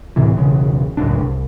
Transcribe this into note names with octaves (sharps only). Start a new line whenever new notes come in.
D2 A2 C3 E3
B1 E2 C#3
C#2 F#2 A2 D4
C2